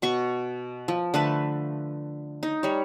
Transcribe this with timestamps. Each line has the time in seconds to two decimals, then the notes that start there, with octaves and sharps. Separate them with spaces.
0.02 B2 F#4 C#6
0.88 F3
1.14 D3 A3 B4 A5
2.43 D#4
2.63 G3 C#5